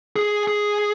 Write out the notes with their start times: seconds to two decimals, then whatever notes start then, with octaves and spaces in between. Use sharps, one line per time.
0.16 G#4
0.48 G#4